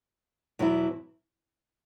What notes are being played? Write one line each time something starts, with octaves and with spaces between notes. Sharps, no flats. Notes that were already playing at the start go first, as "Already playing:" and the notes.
E2 B2 F#3 B3 E4